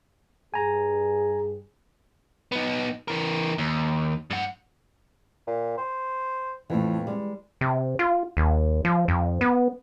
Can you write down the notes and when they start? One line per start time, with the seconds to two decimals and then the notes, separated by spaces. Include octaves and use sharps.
0.54 G2 G#4 G#5 A#5
2.52 B3 D#4
3.08 E3 A#4
3.58 D#2
4.30 G2 F#5
5.47 A#2
5.78 C5
6.70 F2 A2 E3
7.07 G3 G#3
7.61 C3
7.99 F4
8.37 D#2
8.85 F3
9.08 F2
9.41 B3